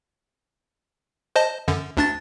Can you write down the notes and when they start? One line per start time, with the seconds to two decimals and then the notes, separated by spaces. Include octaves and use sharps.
1.36 C5 D#5 A5
1.68 F#2 D3
1.97 D2 D4 A6